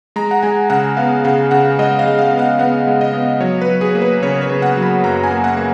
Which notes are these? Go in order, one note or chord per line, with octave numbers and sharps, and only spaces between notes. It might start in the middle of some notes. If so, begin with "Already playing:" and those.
G#3 A#5
F#5
G#3 G#5
C#3 F#5
B3 F5
C#3 F#5
C#3 F#5
G#3 D#5
F5
G#3
F5
B3
F#5
B3 F#5
G#3
D#5
B3
F#3 C#5
B4
F#3
G#4
A#3
B4
C#3 C#5
C#5
C#3
F#5
F#3
B5
F#2 A#5
G#5
A#3
F#5
A#3